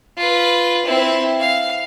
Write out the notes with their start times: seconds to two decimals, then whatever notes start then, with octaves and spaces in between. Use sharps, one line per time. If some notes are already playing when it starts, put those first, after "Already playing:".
0.18 F4 B4
0.85 C4 E4
1.40 F5